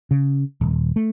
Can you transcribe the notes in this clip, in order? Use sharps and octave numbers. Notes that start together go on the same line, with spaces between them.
C#3
D#1
A3